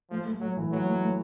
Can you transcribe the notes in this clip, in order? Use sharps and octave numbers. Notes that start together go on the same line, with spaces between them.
F3 A3
A3
F#3 A3
E3
F#3 A3
A3
A3